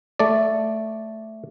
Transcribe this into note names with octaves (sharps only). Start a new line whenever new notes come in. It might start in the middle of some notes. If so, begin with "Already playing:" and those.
A3 D5